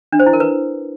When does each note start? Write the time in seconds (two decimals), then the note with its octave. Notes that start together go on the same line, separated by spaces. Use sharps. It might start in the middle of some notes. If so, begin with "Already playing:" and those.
0.13 D4
0.19 C5
0.26 E4
0.33 A#4
0.40 B4